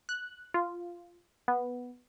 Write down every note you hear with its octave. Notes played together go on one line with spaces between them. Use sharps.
F#6
F4
B3